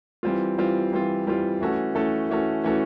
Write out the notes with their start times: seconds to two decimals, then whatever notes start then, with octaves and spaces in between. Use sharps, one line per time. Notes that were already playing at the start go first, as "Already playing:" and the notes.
0.23 E3 G3 C4 F4
0.58 E3 G3 C4 F4
0.92 E3 G3 C4 F4
1.27 E3 G3 C4 F4
1.61 E3 A3 C#4 F#4 A4
1.95 E3 A3 C#4 F#4 A4
2.29 E3 A3 C#4 F#4 A4
2.64 E3 A3 C#4 F#4 A4